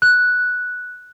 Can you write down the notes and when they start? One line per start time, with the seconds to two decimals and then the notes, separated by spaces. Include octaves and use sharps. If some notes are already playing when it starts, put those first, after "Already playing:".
0.02 F#6